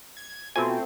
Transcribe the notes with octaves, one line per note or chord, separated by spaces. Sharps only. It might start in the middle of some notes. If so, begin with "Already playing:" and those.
G#6
B2 A3 C4 F4 F#4 C5 G#5